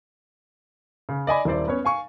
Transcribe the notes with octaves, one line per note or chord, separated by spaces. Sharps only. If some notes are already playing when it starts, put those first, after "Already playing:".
C#3
D5 D#5 G#5 B5
D#1 E4 C5 D5
B3 C#4 C#5
F5 G#5 C#6